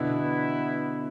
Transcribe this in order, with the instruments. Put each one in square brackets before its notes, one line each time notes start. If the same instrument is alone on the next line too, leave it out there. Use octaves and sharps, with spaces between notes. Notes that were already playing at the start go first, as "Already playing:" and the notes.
Already playing: [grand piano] B2 D3 [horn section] E3 B3 E4